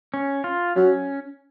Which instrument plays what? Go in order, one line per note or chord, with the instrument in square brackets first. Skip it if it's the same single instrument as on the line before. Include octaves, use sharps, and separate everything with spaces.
[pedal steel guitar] C#4
F4
[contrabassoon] F#3 [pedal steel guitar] C#4